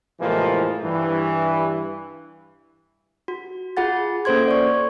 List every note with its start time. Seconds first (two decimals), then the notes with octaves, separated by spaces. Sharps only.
0.20 A2 C3 E3 F3 G#3 A#3
0.83 G2 E3
3.28 F#4
3.77 F4 G#4 F#5 A6
4.25 A#3 C#4 A4 C5 C6 G#6
4.48 D5 C#6